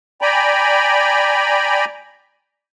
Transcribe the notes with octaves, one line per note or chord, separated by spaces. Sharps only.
D5 G5 G#5 A#5 B5